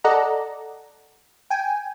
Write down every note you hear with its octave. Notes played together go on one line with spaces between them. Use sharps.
A4 D5 D#5 F#5 A#5
G5 G#5